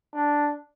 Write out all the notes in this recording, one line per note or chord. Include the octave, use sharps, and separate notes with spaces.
D4